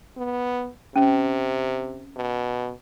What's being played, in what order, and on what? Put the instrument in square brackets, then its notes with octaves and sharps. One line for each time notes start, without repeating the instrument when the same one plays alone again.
[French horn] B3
[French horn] C3 [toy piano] C#4
[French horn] B2